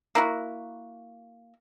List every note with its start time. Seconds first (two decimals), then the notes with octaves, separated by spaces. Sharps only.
0.15 A#3 E4 F#4